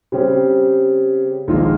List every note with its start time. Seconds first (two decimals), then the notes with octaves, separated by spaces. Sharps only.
0.12 C#3 G3 C4 G4
1.48 A#1 G#2 D#3 A#3 F4